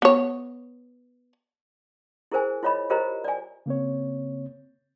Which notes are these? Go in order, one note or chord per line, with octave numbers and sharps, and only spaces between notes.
B3 C#5
E4 G#4 A#4 C5 G#5
E4 F4 C#5 D#5 B5
F4 G4 A#4 C5 D#5 A#5
D5 G#5
C#3 A#3 C4 C#5